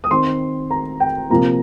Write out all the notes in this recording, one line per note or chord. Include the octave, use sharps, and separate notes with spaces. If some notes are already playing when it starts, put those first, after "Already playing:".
D#6
D#3 C4 C6
A#5
G5
C3 F3 A#3 A#5